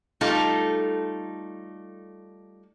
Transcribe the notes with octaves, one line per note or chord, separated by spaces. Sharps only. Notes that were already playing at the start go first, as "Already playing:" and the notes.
G3 A3 D#4 F4 A4